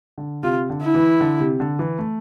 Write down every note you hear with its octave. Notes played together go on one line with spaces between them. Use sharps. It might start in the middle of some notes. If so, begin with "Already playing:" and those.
D3
C3 F4
D3
E4
E3
D3
C3
D3
E3
A3